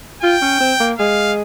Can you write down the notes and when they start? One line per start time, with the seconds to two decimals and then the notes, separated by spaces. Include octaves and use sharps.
0.23 F4 G5
0.42 C#4
0.60 C4
0.80 A#3
0.98 G#3 F5